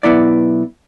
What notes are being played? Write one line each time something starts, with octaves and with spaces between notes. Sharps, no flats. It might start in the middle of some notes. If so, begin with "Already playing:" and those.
B1 F2 B3 E4 D5